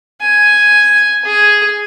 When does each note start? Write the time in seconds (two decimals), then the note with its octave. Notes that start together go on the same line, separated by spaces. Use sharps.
0.22 G#5
1.25 G#4